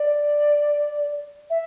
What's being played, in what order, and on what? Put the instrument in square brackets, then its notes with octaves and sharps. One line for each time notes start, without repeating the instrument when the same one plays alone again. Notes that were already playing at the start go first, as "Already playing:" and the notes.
Already playing: [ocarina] D5
E5